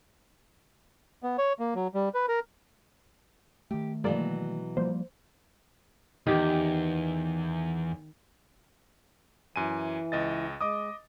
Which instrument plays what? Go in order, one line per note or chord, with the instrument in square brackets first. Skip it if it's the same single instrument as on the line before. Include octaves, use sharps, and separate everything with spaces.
[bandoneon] B3
C#5
A#3
F#3
G3
B4
A#4
[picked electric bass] D#3 A3 [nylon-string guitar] G4
[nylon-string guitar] B2 E3 F#3 [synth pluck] G#3 A#3 D5
[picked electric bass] F3 G3 A#3 [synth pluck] C5
[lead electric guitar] E2 [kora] D#3 G4
[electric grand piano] F#2 G#5 D#7 [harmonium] E3
[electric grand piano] C#2 D#5 A6
[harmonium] G#3 [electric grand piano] D#5 D6 D#6